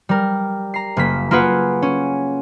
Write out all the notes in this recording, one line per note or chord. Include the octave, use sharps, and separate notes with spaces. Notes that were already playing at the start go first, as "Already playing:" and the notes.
G3 A#4
A#5 C7
F#1 A#3 B6
A#3 F4 G#4 B4 F#5
C#4